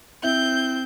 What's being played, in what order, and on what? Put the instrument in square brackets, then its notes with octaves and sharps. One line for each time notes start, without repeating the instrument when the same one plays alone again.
[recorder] C4 [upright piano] E4 [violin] G6